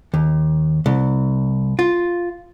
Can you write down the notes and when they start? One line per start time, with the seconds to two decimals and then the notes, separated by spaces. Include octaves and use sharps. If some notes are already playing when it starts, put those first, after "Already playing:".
0.14 D#2
0.86 C2
1.79 F4